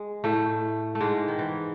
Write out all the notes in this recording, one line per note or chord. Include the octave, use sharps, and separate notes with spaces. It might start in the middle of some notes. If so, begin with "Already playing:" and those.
Already playing: G#3
A2 A3
A3
G#2 G#3
D#3
E3